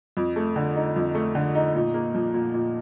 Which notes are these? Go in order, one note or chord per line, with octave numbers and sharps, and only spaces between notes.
F2
A3
D3
D#4
F2
A3
D3
D#4
A#2
A#3
F3
A#2
A#2